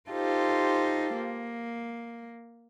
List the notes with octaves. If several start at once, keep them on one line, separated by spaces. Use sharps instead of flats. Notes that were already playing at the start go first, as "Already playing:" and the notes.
D#4 F4 G4 A4 C5
A#3